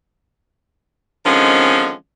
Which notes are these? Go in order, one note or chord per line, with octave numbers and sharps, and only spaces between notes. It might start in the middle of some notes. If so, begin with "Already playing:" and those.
D3 D#3 F3 G#3 C4 C#4